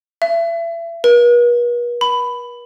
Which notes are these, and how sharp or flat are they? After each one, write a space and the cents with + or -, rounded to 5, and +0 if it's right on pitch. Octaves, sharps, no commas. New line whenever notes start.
E5 +35
B4 -45
B5 +15